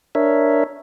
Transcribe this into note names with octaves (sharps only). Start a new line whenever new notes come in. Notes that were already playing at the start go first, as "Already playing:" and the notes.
D4 A#4 C#5 E5